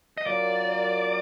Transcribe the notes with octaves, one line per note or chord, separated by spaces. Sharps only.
D#5
F#3 A#3 C#4 F4 A#4 D5